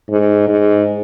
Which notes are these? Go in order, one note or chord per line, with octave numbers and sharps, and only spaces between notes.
G#2
G#2